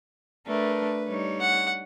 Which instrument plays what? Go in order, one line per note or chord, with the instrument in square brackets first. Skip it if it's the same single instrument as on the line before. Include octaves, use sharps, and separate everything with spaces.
[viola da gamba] A3 D4 A#4 [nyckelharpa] B4
[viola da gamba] G3 D#4 C#5
[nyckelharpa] F#5